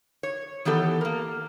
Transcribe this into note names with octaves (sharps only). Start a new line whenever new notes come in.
C#5
D#3 E3 B3 G4 A4
A#3 A#4